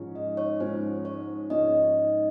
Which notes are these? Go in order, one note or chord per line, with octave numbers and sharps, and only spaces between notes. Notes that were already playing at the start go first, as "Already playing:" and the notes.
Already playing: G#2 F3 G#3 C#4
D#5
C#5
G#2 F3 G#3 C#4 C5
C#5
G#2 F3 G#3 C#4 D#5